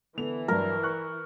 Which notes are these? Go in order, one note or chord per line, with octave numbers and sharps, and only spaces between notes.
D3 E3 B3 F7
G2 F#3 A#4
C#6 F#6